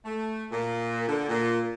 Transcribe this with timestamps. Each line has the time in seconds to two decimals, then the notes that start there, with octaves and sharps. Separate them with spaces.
0.05 A3
0.51 A#2
1.08 D3
1.29 A#2